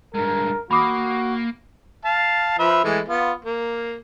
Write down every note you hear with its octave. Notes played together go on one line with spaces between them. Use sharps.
G2 G#3 A#4
A#3 F#4 B5 D6 D#6
F5 A5
F3 B4 E5
E3 G#3 A3
B3 F4
A#3